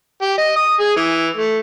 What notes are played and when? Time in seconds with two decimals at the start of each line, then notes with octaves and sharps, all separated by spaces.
0.22 G4
0.38 D#5
0.56 D#6
0.80 G#4
0.97 E3
1.37 A3